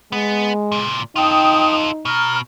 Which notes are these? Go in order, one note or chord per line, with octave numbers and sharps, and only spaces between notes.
G#3 B3
C#2 A#2
D#4 F4 A4 G5 D#6
B2 A#5 F6